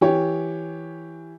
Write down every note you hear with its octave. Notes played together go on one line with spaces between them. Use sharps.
E3 G4 C#5